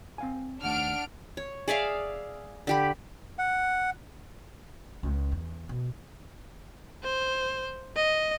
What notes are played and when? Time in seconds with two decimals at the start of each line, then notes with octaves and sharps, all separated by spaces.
0.18 C4 F5 G#5
0.64 D#2 A3 D4 F#5 F6 D7
1.37 C#5
1.68 G#4 D5 E5 F5
2.67 D3 G4 B5
3.39 F#5
5.03 C#2
5.32 E2
5.69 B2
7.04 C5
7.96 D#5